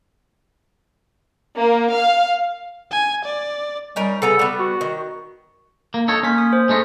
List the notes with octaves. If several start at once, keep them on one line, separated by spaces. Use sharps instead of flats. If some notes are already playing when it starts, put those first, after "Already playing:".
A#3
F5
G#5
D5
G3 C#4 D#4 A#4
C#3 B3 A4 A#5
G3 B3
F#4
D#3
A#3
D#4 A4 C#5
A#3 C#4 B6
D#6
C5
G#3 A3 D#4